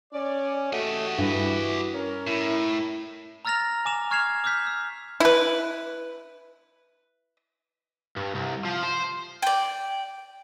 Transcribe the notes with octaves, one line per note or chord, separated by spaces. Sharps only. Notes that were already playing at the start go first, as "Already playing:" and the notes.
C#4 D5
A3 F#4 G4 D#5
G2 E3
C#4 A#4
A2 E4
A#5 E6 F6 A6 A#6 F7
G#5 D6 E7 F7
C#6 F6 G#6 C7 E7 F7
D6 E6 F6 G6 B6
E6
E4 B4
G2
C2
F3
C5
D5 G5